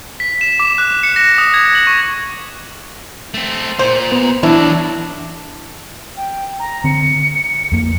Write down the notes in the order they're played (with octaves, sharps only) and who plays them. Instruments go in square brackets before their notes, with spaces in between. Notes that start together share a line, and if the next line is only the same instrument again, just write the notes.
[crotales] B6
E7
D6
F#6
C#7
A#6
D#6
G#6
F#7
C#6
[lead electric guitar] A3 C4
[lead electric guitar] A#2 [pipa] C5
[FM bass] B3
[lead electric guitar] B2 F#3 [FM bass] E3 [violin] D4 [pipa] E4
[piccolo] G5
A#5
[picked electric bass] D3 C4 [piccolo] C#7
[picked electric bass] F2 A#3